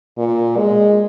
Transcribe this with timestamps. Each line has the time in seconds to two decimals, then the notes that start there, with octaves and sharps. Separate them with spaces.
0.18 A#2
0.58 G#3